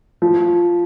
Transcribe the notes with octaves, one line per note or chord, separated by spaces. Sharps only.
F3